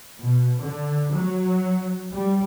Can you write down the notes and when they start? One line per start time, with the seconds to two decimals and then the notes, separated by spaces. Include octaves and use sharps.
0.18 B2
0.58 D3
1.12 F#3
2.10 G3